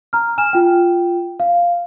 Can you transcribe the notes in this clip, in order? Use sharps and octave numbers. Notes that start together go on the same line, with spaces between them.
A#5 F6
G#5 F6 E7
F4 G5
F5